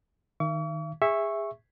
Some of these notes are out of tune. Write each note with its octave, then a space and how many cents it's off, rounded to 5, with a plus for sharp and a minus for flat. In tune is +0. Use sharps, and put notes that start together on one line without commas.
D#3 +0 E5 +45 C#6 +45
G#4 -25 E5 +0 C#6 -10